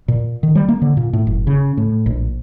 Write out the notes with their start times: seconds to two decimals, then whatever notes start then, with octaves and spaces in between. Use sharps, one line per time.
0.08 A#2
0.43 D#3
0.55 G3
0.69 A#3
0.82 D3
0.97 A#2
1.13 A2
1.27 F#1
1.47 C#3
1.77 A2
2.06 A#1